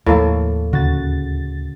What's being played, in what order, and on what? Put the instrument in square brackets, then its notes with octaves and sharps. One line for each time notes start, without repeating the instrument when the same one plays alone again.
[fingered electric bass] D#2 F3 [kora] A2 A#3 A4
[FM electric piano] D2 A6 [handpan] C#3 [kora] F#4